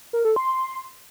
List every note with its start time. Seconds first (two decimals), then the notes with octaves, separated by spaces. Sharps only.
0.13 A#4
0.25 A4
0.36 C6